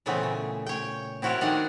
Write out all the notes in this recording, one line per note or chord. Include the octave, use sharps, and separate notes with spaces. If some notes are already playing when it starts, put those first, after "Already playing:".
A#2 C#3 E3 A3 B3 C4
C#3
C#5 G5
C4 E4 F#4 A4 A#4 C#5
D#3 D4 F#5 G#5